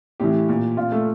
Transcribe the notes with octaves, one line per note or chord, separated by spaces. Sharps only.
A2 E3 G4
A#2
A#2 F4
A3